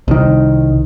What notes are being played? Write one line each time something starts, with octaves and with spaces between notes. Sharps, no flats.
C2 D#3